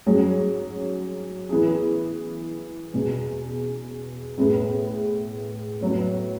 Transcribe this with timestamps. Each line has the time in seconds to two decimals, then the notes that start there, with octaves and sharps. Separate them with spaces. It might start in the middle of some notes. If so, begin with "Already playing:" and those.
0.06 G#2 F#3 C#4 G#4
1.49 E3 B3 E4 G#4
2.93 E2 B2 G#3 B3
4.37 A2 G#3 B3
5.81 A2 F#3 B3